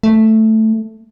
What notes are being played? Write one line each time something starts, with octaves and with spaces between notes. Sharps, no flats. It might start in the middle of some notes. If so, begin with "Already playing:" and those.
A3